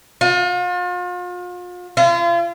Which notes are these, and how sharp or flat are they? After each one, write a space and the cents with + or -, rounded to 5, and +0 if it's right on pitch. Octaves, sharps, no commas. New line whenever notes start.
F4 +40
F4 -35